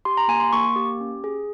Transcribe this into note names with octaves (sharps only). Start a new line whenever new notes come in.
G4 C6
A#5
A#3 G#5
C6
A#3 C#6
G4
C#4
G#4